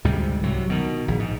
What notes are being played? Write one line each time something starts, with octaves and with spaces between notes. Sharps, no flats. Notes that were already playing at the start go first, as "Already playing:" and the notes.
D2 G#2 C3 G3
C2 C3 F#3
B2 D#3
A#1
G#2